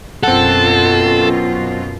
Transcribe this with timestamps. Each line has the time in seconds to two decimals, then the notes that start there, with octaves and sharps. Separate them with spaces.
0.23 F#2 B2 C4 F4 A4 F#5